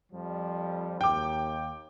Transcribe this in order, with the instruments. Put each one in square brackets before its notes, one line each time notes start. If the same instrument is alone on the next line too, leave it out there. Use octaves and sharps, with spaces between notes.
[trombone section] F2 F3 G3
[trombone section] D#2 [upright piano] G5 D6